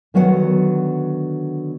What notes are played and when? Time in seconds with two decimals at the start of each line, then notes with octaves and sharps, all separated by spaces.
0.14 D3 D#3 F#3 B3 D#5 F#5